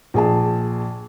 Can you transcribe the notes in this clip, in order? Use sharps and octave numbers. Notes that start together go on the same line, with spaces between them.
A#1 G#4 A5